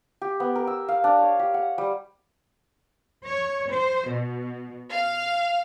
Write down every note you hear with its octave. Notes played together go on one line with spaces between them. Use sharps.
G4
B3
A#4
E6
F5
D4
C#5
G4
F#5
G3
C#5
C5
B2
F5